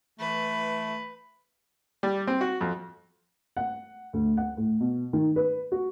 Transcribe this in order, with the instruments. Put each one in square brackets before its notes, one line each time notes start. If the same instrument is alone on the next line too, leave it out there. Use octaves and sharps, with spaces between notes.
[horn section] E3 A3 [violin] B4
[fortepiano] G3
C4
F#4
F2
[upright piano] F#5
D2
F#5
A2
B2
D#3
B4
F#4